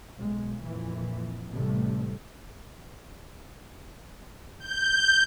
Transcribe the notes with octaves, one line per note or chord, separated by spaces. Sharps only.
B1 G#3
F2 A#2 E3
A1 A2 C3 G3 A3
G6